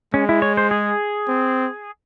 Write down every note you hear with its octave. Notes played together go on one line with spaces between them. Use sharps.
G#3 C#4
E4
C#5
C5
G#4
C4